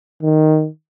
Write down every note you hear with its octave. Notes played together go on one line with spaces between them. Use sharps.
D#3